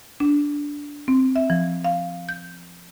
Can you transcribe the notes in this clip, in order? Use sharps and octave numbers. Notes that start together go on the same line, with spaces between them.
D4
C4
E5
F3
F5
G6